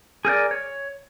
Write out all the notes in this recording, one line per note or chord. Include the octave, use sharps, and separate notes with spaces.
G#4 A#4 C5 D5
C#5